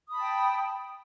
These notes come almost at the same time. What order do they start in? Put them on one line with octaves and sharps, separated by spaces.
D#6 B5 A5 G5